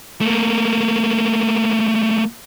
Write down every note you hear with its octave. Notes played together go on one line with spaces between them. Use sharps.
A3 A#3